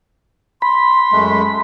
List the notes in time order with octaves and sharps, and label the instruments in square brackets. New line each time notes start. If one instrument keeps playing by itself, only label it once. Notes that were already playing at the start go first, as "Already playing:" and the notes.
[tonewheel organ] B5 [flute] C6
[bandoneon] F#2 G#3 A3